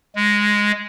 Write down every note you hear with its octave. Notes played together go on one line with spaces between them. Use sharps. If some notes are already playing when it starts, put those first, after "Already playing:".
G#3